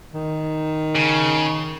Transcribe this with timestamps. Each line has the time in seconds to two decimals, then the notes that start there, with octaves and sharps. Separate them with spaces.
0.13 D#3
0.95 C#3